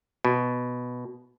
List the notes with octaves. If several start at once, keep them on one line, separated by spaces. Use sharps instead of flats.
B2